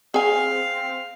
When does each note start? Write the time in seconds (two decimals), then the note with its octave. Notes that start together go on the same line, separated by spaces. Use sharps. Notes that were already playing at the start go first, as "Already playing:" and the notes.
0.14 C4 G#4 F5 G#5